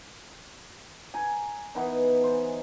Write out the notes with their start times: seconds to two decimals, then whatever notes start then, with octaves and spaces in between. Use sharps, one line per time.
1.14 G#5 A#5
1.75 E3 B3 D#4
2.24 C5